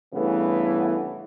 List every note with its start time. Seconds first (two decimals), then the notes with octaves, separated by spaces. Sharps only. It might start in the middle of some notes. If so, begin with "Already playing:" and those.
0.14 G2 C#3 E3 A3 B3